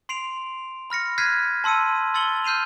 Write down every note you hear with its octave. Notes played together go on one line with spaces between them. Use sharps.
C6 C7 D7 F7
B5 F6 A#6 C#7
F6 F#6 G#6 B6 C7 D#7
A5 C6 E6 C#7 D#7
C6 E6 A6 C#7 F#7 G7
F6 G6 C7 D#7 F7